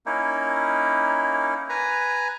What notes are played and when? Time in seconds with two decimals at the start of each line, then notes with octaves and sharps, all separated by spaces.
0.06 A#3 C#4 D#4 E4
1.69 B4 G#5 A#5